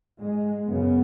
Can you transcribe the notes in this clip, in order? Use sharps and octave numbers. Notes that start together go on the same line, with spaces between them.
G#2 G#3
F#2 C#3 B3